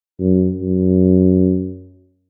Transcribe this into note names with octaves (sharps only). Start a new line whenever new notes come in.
F#2
F#2